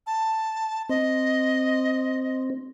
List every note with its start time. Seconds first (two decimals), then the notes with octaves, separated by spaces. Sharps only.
0.07 A5
0.89 C4 D#5